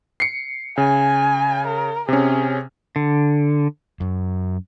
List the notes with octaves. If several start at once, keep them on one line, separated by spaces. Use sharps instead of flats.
C7 C#7
C#3 G#5
A#4
C3 C#4 G#4
D3
F#2